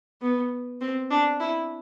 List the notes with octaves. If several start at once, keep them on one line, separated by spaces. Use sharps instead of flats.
B3
C4
D4
E4